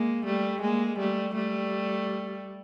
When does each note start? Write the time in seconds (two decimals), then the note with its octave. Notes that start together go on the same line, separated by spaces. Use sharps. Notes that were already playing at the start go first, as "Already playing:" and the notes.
Already playing: G#3 A#3
0.25 G3 A3
0.61 G#3 A#3
0.99 G3 A3
1.35 G3 A3